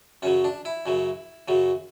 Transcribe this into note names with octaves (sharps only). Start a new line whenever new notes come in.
F#2 C#3 F#3 C#4
D4
E4
F#2 C#3 F#3
F#2 C#3 F#3